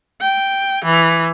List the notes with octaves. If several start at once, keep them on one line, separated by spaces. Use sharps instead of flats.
G5
E3